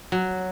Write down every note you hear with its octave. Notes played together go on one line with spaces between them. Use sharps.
F#3